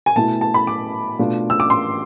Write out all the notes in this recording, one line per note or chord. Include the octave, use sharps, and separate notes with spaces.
G#5
B2 A3 E4 A5
A5
B5
D6
B2 A3 D4 F4
E6
D6
C6